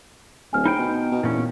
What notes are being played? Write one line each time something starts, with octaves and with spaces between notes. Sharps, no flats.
D1 G#5 F6
D#4 C5 G5 B5
B2
B2
E2 A#2 C#4